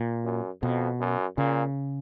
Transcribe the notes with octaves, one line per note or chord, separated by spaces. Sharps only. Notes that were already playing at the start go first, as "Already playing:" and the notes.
Already playing: A#2
F#2
F2 B2
F#2
A#2 C#3